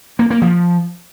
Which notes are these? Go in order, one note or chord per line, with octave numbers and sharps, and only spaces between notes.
A#3
A#3
F3